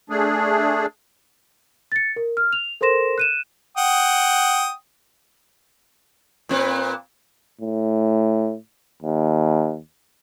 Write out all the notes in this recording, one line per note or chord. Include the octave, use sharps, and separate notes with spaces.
A3 D4 G#4
A6 C#7
A#4
F6
F7
A4 A#4 C5 C6 A#6 E7
F#6 D#7 E7
F#5 G5 D#6
A#2 C4 B4
A2
D#2